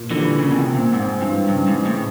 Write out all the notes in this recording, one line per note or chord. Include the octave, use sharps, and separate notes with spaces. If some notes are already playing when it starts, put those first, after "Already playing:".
Already playing: A#2
D3 E3 G3
A#2 C#3
B2
C3
C4
A#2
G#2 C4
G2 E3
G2 C#3
G#2
G#3
A2